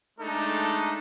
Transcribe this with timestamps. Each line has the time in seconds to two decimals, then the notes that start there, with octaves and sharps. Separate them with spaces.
0.20 G#3 A3 D4 D#4 A4